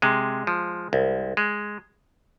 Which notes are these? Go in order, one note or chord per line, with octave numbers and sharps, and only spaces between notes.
C3 G#3
F3
C2
G#3